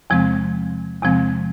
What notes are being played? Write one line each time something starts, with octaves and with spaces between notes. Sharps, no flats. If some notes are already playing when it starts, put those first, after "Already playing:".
E2 C3 F3 G#3 C4
E2 C3 F3 G#3 C4